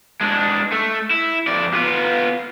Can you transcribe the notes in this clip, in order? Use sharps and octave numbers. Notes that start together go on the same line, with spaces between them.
G#3 D4
A3
E4
F2 D5
B3 F4